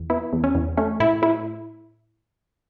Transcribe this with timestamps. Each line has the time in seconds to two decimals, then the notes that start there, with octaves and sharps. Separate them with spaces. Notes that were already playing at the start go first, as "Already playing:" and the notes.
Already playing: E2
0.10 B3 E4
0.33 E2
0.44 C#4
0.55 E2
0.77 A3 C#4
1.00 A2 E4
1.22 A2 E4